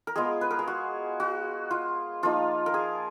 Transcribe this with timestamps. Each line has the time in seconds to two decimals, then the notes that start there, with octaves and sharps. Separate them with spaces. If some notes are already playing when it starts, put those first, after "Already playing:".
0.07 A#4
0.16 G#3 B3 F4 G#4
0.41 B4
0.51 A#4
0.59 G#4
0.68 F#4
1.20 F#4
1.71 F4
2.23 F3 A#3 D#4 F4
2.66 A#4
2.74 G#4